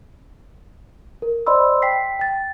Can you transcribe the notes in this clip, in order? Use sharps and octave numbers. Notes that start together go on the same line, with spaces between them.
A#4
C5 D5 D#5 B5 C6 E6
G5 B6 C7
G5 A6